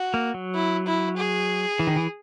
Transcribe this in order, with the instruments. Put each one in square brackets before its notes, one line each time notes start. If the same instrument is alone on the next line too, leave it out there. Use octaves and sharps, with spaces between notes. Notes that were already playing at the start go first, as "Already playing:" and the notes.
Already playing: [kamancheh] F#4
[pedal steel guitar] A#3
F#3
[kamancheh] E4
E4
G#4
[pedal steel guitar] E3
D#3
E3